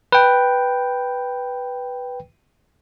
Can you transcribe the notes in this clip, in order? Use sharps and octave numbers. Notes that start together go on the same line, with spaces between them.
B4 G5